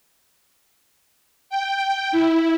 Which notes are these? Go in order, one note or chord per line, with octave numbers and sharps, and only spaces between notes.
G5
E4